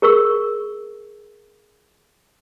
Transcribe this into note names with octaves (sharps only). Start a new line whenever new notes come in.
G#4 A#4 C#6 E6